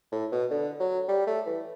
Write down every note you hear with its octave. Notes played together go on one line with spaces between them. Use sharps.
A2
B2
D3
F#3
G3
A3
E3